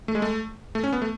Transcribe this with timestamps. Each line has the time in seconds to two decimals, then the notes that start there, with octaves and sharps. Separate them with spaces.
0.08 A3
0.15 G#3
0.22 A3
0.75 A3
0.84 C#4
0.93 B3
1.02 A3